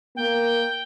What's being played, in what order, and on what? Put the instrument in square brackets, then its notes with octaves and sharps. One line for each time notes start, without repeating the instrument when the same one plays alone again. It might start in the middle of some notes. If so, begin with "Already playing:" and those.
[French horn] A#3 [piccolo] G5